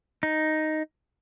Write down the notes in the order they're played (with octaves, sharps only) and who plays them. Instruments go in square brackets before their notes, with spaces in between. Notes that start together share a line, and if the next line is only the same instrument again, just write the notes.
[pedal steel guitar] D#4